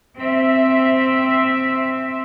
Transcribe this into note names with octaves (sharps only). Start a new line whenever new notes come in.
C4 E5